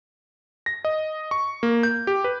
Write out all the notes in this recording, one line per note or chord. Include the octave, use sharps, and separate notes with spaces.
A#6
D#5
C#6
A#3
G6
G4
B4